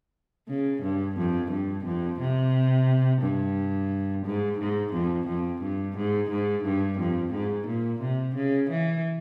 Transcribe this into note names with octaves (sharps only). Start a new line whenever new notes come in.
C#3
G2
F2
G2
F2
C3
G2
G#2
G#2
F2
F2
G2
G#2
G#2
G2
F2
G#2
A#2
C3
C#3
E3